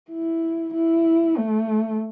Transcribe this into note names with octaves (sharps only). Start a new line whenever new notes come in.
E4
E4
A3